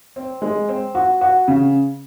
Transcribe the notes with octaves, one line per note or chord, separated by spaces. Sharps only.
C4
G#3
C4
F#4
F#4
C#3